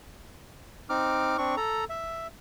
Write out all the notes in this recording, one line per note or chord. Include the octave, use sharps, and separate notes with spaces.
C4 D#4 D6 F6
C4 D4 C#6
A4 A#5
E5